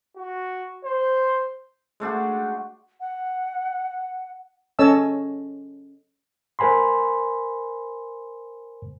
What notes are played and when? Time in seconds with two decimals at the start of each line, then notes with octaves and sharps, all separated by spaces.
0.17 F#4
0.85 C5
2.00 G#3 A3 D4 F#4
3.01 F#5
4.79 C#4 A4 C#5 D#5 A5 E6
6.59 A#4 C5 G#5 B5 C6